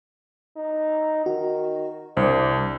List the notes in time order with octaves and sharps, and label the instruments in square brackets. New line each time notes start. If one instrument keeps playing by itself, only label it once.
[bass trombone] D#4
[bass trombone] D#3 [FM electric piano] F#4
[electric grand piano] C2 [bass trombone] D4 [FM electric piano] C5